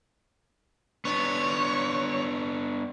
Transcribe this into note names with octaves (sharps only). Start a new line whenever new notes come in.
B3 D4 C#5